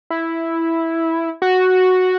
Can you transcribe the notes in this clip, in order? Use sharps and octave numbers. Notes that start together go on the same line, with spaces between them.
E4
F#4